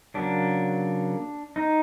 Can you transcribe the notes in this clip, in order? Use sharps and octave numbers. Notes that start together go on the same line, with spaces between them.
C#3 F#3 A#3 D4
D#4